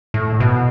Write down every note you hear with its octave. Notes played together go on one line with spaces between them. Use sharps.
A2
B2